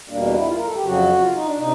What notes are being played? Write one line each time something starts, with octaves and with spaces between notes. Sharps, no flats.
E2 B2 G3 A#3 D4
D4
E4
F4
A#4
A4
G4
F2 C#3 F#3 F#4
F4
D#4
D4
C3 D#4